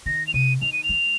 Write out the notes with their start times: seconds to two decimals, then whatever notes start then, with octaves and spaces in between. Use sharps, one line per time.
0.06 D#3 A#6
0.27 F7
0.34 C3 D#7
0.61 D#3 F7
0.73 D#7
0.84 F7
0.89 G#3